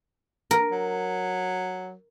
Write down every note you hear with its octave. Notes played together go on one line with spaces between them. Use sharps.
A#4
F#3